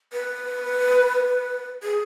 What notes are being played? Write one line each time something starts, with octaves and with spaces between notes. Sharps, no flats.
B4
G#4